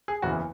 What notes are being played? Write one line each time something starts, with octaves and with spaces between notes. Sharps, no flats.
G#4
F#1 E2 C#3 E3 F#4